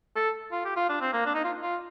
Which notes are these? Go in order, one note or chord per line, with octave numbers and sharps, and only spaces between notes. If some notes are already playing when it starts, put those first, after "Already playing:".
A4
F4
G4
F4
D4
C4
A#3
D4
D#4
F4
F4